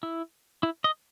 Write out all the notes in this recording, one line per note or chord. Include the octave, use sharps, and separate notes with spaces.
E4
E4
D#5